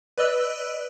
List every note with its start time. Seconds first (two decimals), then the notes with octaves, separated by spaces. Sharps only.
0.18 B4 D5 D#5 E6 F#6